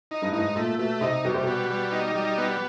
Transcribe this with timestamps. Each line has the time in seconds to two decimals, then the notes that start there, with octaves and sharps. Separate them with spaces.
0.11 D#4
0.22 G2
0.31 A2 D#4
0.39 G#2
0.55 A#2 A3
0.79 B2 A3
1.01 C3 D#4
1.24 B2 G3
1.34 C3
1.43 B2 B3
1.70 G3
1.92 D#4
2.16 G3
2.38 B3